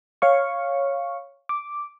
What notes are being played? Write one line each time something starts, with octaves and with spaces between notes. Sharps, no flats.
C#5 F5 C#6
D6